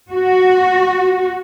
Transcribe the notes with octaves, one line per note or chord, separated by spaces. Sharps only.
F#4